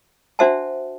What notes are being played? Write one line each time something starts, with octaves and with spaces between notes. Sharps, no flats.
D4 F#4 C5 E5 F#5 A5